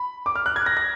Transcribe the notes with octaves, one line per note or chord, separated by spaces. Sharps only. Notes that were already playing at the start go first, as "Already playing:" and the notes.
Already playing: B5
D6
F6
F#6
G#6
A#6
A#6